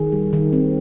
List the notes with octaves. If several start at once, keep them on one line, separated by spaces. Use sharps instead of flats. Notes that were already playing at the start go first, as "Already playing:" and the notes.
Already playing: D#3 G#4
G3
D#3
C4